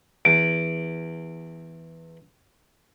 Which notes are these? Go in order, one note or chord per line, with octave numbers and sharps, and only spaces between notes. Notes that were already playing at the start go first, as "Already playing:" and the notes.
E2 D7